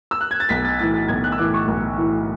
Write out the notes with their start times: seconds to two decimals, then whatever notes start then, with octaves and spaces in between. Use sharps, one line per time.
0.11 E6
0.21 F#6
0.31 G#6
0.40 A6
0.49 B1 B6
0.65 A6
0.79 A2 E3 A6
0.94 A6
1.08 B1 G#6
1.24 F#6
1.32 E6
1.38 A2 E3 D6
1.54 C#6
1.68 B1
1.97 A2 E3